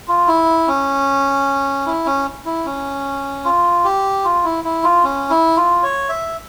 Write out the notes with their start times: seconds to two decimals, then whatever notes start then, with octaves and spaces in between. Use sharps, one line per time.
0.08 F4
0.27 E4
0.68 C#4
1.86 E4
2.06 C#4
2.46 E4
2.66 C#4
3.45 F4
3.84 G4
4.24 F4
4.44 E4
4.64 E4
4.84 F4
5.04 C#4
5.30 E4
5.57 F4
5.83 C#5
6.09 E5